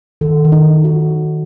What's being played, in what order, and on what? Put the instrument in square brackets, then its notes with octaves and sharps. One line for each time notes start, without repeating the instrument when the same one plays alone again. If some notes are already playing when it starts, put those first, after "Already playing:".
[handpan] D#3 A4
D#3
D#4
D#3
F#4